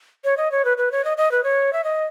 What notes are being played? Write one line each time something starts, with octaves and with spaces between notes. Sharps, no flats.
C#5
D#5
C#5
B4
B4
C#5
D#5
D#5
B4
C#5
E5
D#5